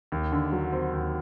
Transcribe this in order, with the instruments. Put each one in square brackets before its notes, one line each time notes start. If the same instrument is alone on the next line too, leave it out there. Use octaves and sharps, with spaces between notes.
[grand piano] D#2
D3
F#3
C4
D#2